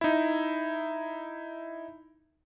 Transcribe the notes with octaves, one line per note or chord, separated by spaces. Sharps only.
D#4 E4